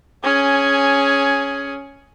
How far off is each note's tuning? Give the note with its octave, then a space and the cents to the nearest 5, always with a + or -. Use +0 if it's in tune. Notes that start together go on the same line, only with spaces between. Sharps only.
C#4 +0 G#4 +10